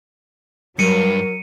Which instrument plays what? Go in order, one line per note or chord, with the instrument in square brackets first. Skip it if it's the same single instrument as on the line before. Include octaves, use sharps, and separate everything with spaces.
[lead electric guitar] G2 [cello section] F#3 [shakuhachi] A#4 [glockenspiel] C#7 D#7